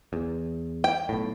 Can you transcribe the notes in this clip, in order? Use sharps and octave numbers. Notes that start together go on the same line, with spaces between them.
E2
G5
B1 A2